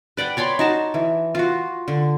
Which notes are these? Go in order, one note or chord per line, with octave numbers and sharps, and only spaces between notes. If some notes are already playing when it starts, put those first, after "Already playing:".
B4 D5 F#5 G5
C#5 D5 B5 C6
D#4 F#4 A5
E3
F4 F#4
D3